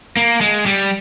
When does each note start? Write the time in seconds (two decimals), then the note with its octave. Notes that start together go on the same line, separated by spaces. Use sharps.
0.17 A#3
0.41 G#3
0.66 G3